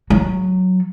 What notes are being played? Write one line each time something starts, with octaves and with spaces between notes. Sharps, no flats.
F#3